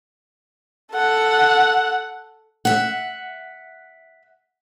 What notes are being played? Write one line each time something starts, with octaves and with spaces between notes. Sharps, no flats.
A4 F#5
E5 F#5